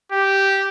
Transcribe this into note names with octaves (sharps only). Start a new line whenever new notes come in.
G4